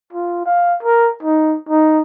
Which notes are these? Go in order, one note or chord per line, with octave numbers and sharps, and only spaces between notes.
F4
F5
A#4
D#4
D#4